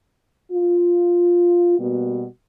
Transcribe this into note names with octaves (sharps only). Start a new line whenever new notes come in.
F4
B2 G3 A#3 B3 F#4